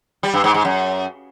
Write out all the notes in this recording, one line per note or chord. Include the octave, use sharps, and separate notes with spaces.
G3
G2
G#2
G#2
F#2